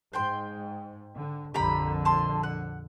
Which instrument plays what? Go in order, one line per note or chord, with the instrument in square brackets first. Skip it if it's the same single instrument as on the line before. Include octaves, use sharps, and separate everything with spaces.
[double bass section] G#2 [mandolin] C5 G5 C6
[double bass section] D3
[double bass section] A#1 F2 D3 [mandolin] G4 A#5 B5
[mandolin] A5 C6
F#5